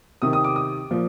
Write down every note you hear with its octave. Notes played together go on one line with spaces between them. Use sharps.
C3 D#3 D#6
D#6
D6
D#6
A#2 F3